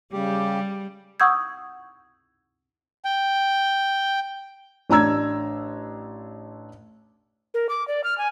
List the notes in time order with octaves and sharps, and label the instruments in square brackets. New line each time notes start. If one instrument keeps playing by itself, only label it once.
[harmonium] C#3 G4 [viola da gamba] G3
[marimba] F#5 C#6 D#6 E6 G6 G#6
[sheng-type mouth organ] G5
[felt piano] A1 D4 A#5 E6 G#6
[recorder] A#4
D6
D5
F6
G#5